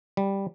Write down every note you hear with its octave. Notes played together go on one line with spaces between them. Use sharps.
G3